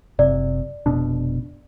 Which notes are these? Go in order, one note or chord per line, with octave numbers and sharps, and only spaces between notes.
F#1 C3 D5
F1 B2 D4